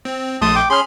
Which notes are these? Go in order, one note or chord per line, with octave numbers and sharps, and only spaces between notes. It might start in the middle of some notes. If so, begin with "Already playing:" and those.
C4
A#1 A3 A5 C6 D#6
G5 D6
C#4 G#4 B5 C6 F6